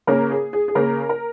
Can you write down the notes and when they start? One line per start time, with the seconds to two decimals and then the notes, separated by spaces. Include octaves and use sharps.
0.07 C#3 A#3 C#4 A#4
0.31 G#4
0.53 G#4
0.68 G#4
0.75 C#3 A#3 C#4 A#4
1.09 A#4